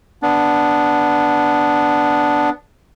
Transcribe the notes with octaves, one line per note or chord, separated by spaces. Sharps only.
B3 D4